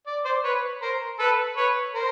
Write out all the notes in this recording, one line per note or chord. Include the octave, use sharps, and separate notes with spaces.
D5
C5 D5
B4 C#5
A#4 C5
A4 B4
B4 C#5
A#4 C5